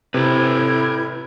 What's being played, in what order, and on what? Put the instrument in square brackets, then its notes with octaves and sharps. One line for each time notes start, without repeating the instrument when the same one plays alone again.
[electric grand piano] C3 [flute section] E4 G6 G#6 [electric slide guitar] A4 B4